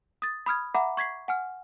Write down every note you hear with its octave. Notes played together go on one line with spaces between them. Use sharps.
D#6 A6
B5 D#6 F6 G#6
E5 F#5 A#5 B5 D6
C#6 G#6 B6 C7
F#5 G#5 F6